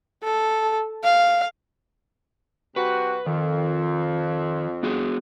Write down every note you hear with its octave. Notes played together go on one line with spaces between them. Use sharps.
A4
F5
C3 G3 F#4 B4
F2 D#3
B3 F#4 G#4